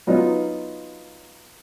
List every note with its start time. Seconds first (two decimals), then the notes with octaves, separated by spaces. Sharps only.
0.07 F#3 B3 D#4 F4